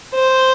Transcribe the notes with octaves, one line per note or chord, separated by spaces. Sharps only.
C5